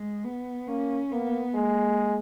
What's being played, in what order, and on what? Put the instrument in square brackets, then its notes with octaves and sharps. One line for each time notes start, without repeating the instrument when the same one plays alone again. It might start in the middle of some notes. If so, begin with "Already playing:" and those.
Already playing: [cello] G#3
B3
[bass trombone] A#3 [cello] C#4
[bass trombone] A#3 [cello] B3
[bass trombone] G#3 [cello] A#3